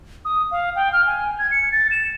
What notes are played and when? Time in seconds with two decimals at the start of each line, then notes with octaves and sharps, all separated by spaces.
0.25 D#6
0.51 F5
0.76 G5
0.93 F6
1.06 G#5
1.39 G#6
1.51 C#7
1.72 A6
1.91 E7